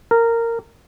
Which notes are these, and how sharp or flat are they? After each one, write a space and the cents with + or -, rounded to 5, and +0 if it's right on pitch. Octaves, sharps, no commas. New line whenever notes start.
A#4 -15